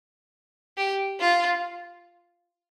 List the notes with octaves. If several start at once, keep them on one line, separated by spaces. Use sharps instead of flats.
G4
F4